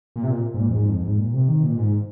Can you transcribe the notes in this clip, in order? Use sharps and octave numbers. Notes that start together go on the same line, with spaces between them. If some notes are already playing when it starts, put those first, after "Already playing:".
A#2
C3
A#2
G#2
A#2
F2
G#2
F2
F2
G#2
A#2
C3
D#3
A#2
G#2